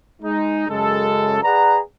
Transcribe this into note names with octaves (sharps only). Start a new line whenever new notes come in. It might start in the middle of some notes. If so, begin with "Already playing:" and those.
G#3 D#4
F#2 C#3 G#3 A4
G#4 B4 D5 F#5 A#5